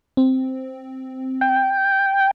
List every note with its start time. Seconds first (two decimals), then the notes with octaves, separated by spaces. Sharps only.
0.17 C4
1.41 G5